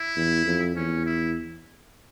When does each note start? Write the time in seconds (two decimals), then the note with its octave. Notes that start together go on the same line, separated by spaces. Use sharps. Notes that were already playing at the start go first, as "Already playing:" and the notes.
Already playing: E4
0.17 E2
0.46 F2
0.76 E2 C#4
1.06 E4